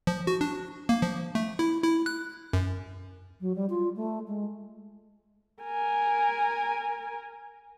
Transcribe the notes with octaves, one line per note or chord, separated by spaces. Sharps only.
F3
F#4
D4
A#3
F3
A3
E4
E4
F#6
F#2
F#3
G3
F4
A3
G#3
A#4 G#5